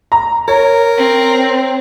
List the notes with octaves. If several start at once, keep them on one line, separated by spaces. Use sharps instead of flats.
A#5
A#4 C#5
C4